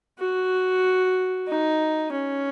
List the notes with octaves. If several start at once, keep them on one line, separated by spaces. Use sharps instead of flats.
F#4
D#4
C#4